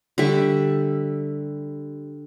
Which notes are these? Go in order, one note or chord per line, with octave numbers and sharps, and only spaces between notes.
D3 G3 E5 C#6